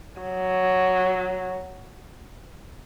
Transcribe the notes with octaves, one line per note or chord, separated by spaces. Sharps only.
F#3